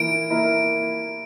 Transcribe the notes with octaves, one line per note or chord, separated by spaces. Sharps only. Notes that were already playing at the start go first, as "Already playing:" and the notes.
Already playing: E3 A#3 E4 A#4 D7
A#3 E4 A#4